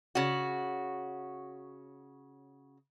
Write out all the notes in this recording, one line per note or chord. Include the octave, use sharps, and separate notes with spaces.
C#3 F#4